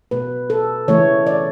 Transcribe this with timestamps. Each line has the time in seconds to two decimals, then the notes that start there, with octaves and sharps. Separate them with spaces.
0.11 B2 A3 B4
0.50 A4
0.88 C#3 E3 A3 C#5
1.27 D5